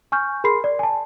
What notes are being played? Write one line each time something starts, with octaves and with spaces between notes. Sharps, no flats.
G#5 C#6 F6 G6
G#4 A#4 B5 C6 C7
D5
G#5 A5